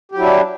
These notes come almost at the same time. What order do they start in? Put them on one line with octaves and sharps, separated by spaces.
G4 F#3 E4 D4